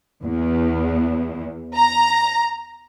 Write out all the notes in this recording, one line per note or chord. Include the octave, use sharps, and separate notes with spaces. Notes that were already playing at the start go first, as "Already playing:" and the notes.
E2
A#5